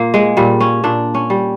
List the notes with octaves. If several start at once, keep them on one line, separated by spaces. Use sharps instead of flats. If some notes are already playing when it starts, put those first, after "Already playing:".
Already playing: A#2 A#3
G#3
A#2 G3
C#4
A#2 D4
C#4
G3